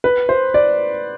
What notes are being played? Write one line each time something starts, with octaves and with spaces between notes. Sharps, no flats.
B4
C5
D5